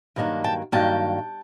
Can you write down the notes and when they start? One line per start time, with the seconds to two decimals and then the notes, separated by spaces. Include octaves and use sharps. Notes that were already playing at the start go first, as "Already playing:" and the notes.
0.16 G2 D#3 F#3 A#3 D4
0.44 G5 A5
0.72 G2 D#3 F#3 A#3 D4 G5 A5